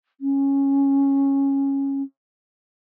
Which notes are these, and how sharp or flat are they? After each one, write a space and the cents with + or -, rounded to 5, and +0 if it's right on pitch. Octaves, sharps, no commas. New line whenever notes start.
C#4 -10